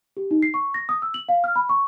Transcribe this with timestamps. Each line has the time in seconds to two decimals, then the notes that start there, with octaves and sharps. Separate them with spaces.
0.17 G4
0.31 D#4
0.43 C7
0.54 C#6
0.74 A#6
0.89 D#6
1.02 E6
1.14 F#7
1.29 F5
1.44 F6
1.56 B5
1.69 C#6